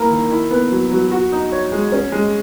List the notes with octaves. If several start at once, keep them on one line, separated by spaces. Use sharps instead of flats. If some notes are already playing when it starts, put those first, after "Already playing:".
Already playing: A#3 E4 A#4
D#3
E4
B3
F#3
F#3
F#4
D#4
C#5
G#3
C#4
G#3